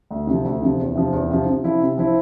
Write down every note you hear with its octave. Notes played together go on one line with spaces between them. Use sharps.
D2
C3 F3
D2
C3 F3
E2
C3 F3
E2
C3 F3
C3
F3 C4 E4
C3
F3 C4 E4